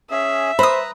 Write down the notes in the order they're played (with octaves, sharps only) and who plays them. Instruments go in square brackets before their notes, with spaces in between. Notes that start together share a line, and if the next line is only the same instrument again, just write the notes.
[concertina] C#4 G#4 [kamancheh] E5
[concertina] B4 A#5 [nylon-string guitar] C5 [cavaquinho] B5 D#6